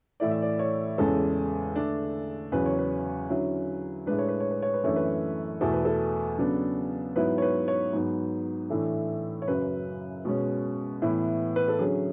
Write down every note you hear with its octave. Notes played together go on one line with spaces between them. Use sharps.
A2 E3 A3 E4 D5
E5
D5
C#5
E2 C#3 G#3 C#4 A4
D3 A3 D4
E2 C#3 F#3 B4
C#5
B4
D3 F#3 C#4 E4
A2 G#3 D4 B4
C#5
B4
C#5
B4
C#5
B4
F#2 E3 A3 D4 C#5
B4
E2 B2 A3 E4 A4
B4
A4
C#3 F#3 B3 D4
G#2 F#3 B3 E4 B4
C#5
B4
C#5
G#2 F#3 B3
A2 E3 A3 D4
C#5
F#2 C#3 F#3 B4
B2 G#3 C#4
A2 E3 B3 E4
B4
A4
D3 F#3 C#4 G#4